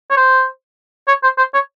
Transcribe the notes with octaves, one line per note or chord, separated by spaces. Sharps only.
C#5
C5
C#5
C5
C5
C#5